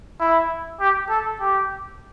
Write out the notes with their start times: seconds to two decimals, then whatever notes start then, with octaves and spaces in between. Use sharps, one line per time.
0.20 E4
0.80 G4
1.09 A4
1.40 G4